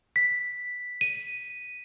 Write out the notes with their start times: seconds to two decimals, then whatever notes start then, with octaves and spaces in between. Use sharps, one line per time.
0.16 B6
1.01 D#7